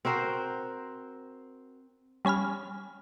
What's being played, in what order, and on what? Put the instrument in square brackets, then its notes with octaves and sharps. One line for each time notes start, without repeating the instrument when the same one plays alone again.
[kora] C4 F#4 A#4 C5
[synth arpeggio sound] G3 C#4 G#5 B5 F6